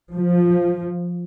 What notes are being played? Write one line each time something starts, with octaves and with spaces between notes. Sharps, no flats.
F3